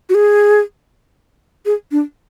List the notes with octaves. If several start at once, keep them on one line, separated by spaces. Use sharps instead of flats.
F#4
G#4
G#4
D4